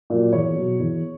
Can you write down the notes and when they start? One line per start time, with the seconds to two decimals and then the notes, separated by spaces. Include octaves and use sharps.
0.10 A#2 F#3
0.32 E2 C#5
0.56 B2 F#3
0.80 E2